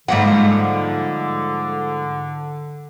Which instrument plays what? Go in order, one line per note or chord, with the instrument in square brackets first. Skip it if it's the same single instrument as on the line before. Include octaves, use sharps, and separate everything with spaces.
[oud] G#2 F3 [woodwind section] D3 [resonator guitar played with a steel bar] G3 A#3 F#5